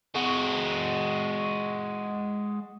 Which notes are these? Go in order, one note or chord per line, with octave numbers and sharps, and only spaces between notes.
G#3 F#4